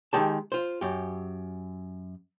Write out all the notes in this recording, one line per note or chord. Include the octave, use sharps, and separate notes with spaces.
D#3 G#3 G4 A5
F4 C5
F#2 G4